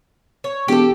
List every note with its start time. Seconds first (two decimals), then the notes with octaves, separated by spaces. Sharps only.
0.44 C#5
0.68 E1 G4 A4